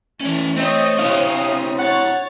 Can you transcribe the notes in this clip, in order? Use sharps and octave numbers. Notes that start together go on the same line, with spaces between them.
E3 A3 C#4 D5
A3 C4 C5 C#5 D#5 D#6
C3 C4 D4 E4 F5 A5
C#5 F#5 A6